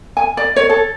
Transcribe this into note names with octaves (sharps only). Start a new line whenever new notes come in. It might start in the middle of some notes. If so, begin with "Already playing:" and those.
G#5
D5
C#5
A4